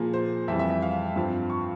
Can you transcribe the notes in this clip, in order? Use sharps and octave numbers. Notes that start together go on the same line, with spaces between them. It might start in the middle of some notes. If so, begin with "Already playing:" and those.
Already playing: A#2 F3 A#3 G#4
C5
F2 E3 G3 E5
E5
E5
F5
G2 F3 C4
C#6